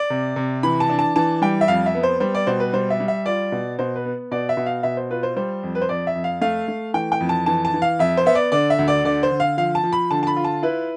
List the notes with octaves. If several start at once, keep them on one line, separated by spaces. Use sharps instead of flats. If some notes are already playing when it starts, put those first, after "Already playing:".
Already playing: D5
C3
C3
E3 B5
A5
D4
A5
E3 A5
G3 G5
E5
F2 F5
E5
B3
C5
G3 C5
D5
B2 C5
B4
G3 C5
E5
G3
E5
F4 D5
B2
B2 C5
B4
B3
B2 D5
E5
B2
F5
B2 E5
C5
F4 B4
C5
G3 C5
F2
B4
C5
F2 D5
E5
F2
F5
A3 F5
A3
E3 G5
G5
F2
A5
E3 A5
A5
E3
F5
F2 E5
C5
B3 E5
D5
D3 D5
E5
D2
D5
D3 D5
C5
D3
F5
F3 F5
A5
F3
B5
D3 A5
A5
B5
F4
A5
E4 B4